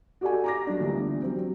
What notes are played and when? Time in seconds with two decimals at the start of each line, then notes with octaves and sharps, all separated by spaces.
0.21 F#4 G4 A4 D5 F#5 G#5
0.44 A#5 D6 A#6
0.67 F#3 D4
0.80 D2 A#2 E3 G3 B3
1.22 F#3 C4
1.39 F#3